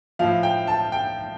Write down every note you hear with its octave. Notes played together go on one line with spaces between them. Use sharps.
A2 F3 F5
G5
A5
G5